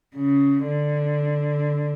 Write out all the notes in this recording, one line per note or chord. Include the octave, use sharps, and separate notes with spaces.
C#3
D3